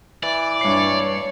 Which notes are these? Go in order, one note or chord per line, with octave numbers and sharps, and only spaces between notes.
E3 D5
G2 C#5 C7